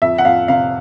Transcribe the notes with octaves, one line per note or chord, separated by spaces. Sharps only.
F2 E5
F#5
F2 F5
C3 F5